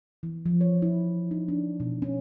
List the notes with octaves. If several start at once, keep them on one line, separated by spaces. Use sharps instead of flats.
E3
F3
C#5
E4
D#4
D4
B2
C#4